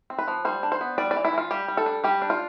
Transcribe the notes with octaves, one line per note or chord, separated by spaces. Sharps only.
C4
B4
F3
G3 C5
D4
C5
B3
G3 D5
D5
E3
E4
E3 F4
G3 G4
G3
A4
D4
G3 G4
D4
F4